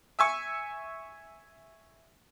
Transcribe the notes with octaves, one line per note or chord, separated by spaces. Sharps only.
E5 G#5 C#6